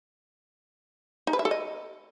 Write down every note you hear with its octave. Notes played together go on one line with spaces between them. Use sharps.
D#4
B4
E5
A4
D#5